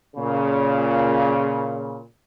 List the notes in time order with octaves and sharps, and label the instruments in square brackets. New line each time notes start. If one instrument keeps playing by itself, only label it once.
[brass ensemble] A#2 C#3